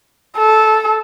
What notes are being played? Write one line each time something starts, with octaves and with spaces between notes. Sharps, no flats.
A4